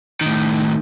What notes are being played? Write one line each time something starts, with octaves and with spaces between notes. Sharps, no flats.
A2 D#3